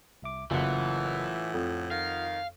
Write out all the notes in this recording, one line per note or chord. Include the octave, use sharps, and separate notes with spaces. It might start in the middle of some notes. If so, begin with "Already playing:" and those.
C2 E5 D6
F#1 A2 E3 F4 F#5
F2
D#3 F5